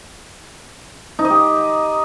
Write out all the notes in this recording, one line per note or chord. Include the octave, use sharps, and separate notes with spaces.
D#4
D#5
G4